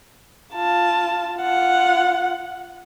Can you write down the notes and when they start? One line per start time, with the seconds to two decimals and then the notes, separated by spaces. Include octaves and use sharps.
0.54 F4 A5
1.39 F4 F#5